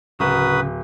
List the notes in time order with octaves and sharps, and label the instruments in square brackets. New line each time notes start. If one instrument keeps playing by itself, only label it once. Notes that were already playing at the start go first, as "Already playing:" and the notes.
[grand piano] D1 [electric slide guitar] C#3 [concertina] F#4 A#4 D#6 [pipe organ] B4